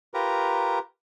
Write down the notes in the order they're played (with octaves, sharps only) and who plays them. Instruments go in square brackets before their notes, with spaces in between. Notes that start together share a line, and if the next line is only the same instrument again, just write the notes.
[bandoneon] F4 G4 A#4 B4 A#5